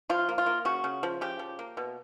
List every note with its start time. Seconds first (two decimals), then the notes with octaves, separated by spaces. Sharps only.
0.09 F3 F4
0.29 A#3
0.38 F4
0.46 A#3
0.65 C#3 F#4
0.84 C#3
1.03 F3
1.21 C#3 G4
1.39 F3
1.59 A#3
1.77 B2